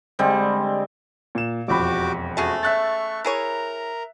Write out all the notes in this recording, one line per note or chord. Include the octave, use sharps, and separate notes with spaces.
D3 G3 G#3 C4
A#2 E7
E1 F2 F#4 G4 B5 D6
A3 C#4 F#4 G#4
E5 C#6 F#6 A6
E4 G#4 A#4 C#5 A#5